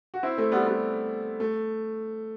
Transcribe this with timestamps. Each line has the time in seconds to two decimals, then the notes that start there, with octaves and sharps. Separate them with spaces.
0.14 F#4
0.23 C4 E4
0.38 A3 C4
0.52 G3 B3
0.66 G3 B3
1.40 A3